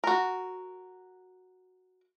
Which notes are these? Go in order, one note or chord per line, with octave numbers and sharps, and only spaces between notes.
F#4 A#4